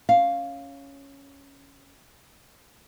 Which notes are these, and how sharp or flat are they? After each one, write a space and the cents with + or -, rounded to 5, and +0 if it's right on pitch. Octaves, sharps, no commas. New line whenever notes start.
C#4 +0 F5 +0